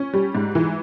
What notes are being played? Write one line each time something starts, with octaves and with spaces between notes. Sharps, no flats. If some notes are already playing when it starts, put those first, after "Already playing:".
Already playing: C#4
G3
G#2
E3